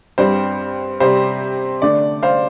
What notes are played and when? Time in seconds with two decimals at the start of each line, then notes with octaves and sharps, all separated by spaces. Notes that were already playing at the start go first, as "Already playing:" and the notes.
0.18 G2 G3 C4 C5
1.00 C3 G3 C4 C5
1.82 D3 A3 D4 D5
2.23 C5 F5